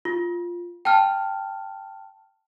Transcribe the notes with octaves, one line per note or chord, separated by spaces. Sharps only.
F4
G5 A5 F6